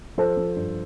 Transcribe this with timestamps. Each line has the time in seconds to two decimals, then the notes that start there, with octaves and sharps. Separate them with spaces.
0.17 F3 A4 C5
0.37 F3
0.56 G2